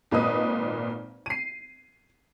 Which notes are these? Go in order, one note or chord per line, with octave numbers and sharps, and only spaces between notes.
G#1 A#2 B4 D#5 D#6
C7 D#7